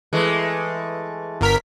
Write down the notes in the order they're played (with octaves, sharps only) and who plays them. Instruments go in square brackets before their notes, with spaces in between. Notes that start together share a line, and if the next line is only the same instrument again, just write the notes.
[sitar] E3 G#3 A3
[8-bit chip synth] G1 A#4 B6